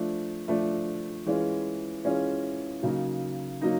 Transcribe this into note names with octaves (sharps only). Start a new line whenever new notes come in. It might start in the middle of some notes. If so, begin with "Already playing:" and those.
Already playing: F3 A3 D4
F3 A3 D4
E3 G#3 C#4 F4 G#4
E3 G#3 C#4 F4 G#4
C#3 F#3 A#3 D#4
F#3 A#3 D#4